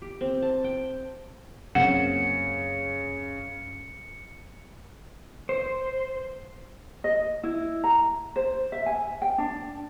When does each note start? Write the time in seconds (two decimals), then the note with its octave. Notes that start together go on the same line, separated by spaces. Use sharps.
0.02 G4
0.21 C4
0.42 A5
0.64 G5
1.75 F#2 C#3 A#3 C4 F#5 C#7
5.49 C5
7.04 D#5
7.43 E4
7.84 A#5
8.36 C5
8.72 E5
8.86 G#5
9.22 G5
9.38 D4